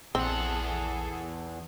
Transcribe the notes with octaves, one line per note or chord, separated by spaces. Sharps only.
A#1 E2 C4 G#4 A4 F#5